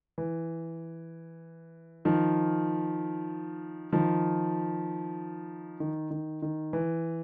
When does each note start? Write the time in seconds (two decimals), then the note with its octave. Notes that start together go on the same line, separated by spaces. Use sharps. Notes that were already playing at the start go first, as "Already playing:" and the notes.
0.18 E3
2.05 D#3 F3
3.93 D#3 F3
5.80 D#3
6.11 D#3
6.42 D#3
6.73 E3